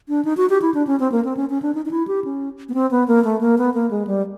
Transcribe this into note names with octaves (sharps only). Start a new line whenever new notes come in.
D4
D#4
F#4
G4
E4
D4
C#4
C4
A#3
C4
C#4
C#4
D4
D#4
D#4
E4
G4
C#4
B3
C4
B3
A#3
A3
A#3
B3
A#3
G#3
G3